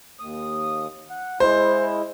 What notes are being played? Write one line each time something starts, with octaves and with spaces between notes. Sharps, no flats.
D#2 D#6
F#5
G#3 E4 C5